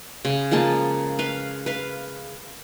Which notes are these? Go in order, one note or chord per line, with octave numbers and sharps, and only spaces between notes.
C#3
F3 G#3 A#3 A5
B4 F5
B4 F5